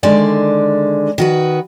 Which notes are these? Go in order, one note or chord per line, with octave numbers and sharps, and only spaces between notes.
D3 D#3 G#3 D5
D#3 F#4 B4